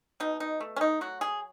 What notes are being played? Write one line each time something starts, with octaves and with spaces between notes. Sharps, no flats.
B2 D#4
D#4
A3
C#4
D#4
F#3 F#4
G#4